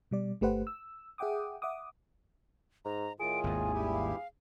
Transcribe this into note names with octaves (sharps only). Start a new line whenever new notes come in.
B2 G3 D5
G1 A3 G4 B4 C5 F#5
E6
G#4 E5 F#5 G5 D6 D#6
E5 F#5 D6 D#6
G#2 A#5
A2 D#3 F4 G#4 D7
G#1 D#2 G#5
G2 E4 G4
F5